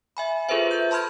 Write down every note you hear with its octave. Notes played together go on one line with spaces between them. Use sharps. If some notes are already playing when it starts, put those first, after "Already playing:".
E5 G#5 B5
F4 G#4 A4 B4 C5 E5
G6
A5 B5 C6 F6 G#6